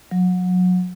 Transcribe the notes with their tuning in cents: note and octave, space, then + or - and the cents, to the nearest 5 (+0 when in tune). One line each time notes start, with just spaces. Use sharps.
F#3 -30